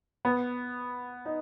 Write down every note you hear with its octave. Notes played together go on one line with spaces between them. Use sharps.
B3
D#4